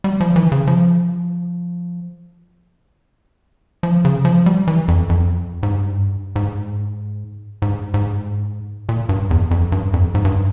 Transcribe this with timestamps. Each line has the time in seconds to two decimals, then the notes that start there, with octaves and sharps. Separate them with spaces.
0.04 G3
0.20 F3
0.36 E3
0.52 C#3
0.67 F3
3.83 F3
4.05 C#3
4.25 F3
4.46 G3
4.68 E3
4.88 F2
5.09 F2
5.63 G#2
5.73 G2
6.36 G#2
7.62 G#2
7.94 G#2
8.89 A#2
9.09 G2
9.31 E2
9.51 F2
9.72 G2
9.94 F2
10.15 G#2
10.25 G2